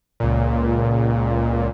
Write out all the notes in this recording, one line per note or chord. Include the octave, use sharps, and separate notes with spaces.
C#2 A#2